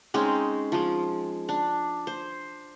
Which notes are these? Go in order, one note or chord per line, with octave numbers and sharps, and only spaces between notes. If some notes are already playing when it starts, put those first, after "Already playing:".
G#3 C4 C#4 D#4
F3 G#3
D4
C5